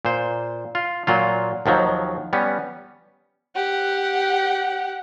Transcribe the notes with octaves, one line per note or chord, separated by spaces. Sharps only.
A#2 C5
F4
A#2 F#3 F4
D#2 D#3 F3 F#3
G3 B3 C#4
G4 F#5